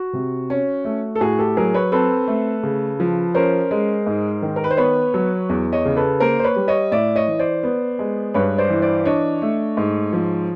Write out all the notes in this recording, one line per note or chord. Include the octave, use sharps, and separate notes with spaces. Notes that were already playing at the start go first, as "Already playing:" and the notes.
Already playing: F#4
C3
C#4
A3
A4
A2 F#4 G#4
G4 A4
F#3 G#4 A#4
B4 C#5
C4 A4 B4
A3
C#3
F3
C#4 A#4 C5
G#3
G#2
D#3
A#4
B4
C5
B3 B4 C#5
F#3
E2
C#5 D#5
C#3
A4 B4
A#3 A#4 C5
C5
B4 C#5
G3
C#5 D#5
A2 D5 E5
C#5 D#5
E3
C5 D5
B3
G#3
G2 B4 C#5
C5 D5
E3
C5 D5
D4 C#5 D#5
A3
G#2
F3